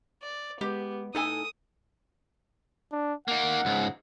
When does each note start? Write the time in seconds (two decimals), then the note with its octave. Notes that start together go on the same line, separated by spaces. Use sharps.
0.22 D5
0.61 G#3 B3 G4
1.15 A2 D#4 A4 G#5 D#6
2.92 D4
3.28 A#3 D#4 F#5
3.65 C#2 G#2